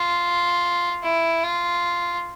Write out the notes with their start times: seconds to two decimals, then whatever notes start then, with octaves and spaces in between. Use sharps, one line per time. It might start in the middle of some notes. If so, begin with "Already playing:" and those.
Already playing: F4
1.04 E4
1.44 F4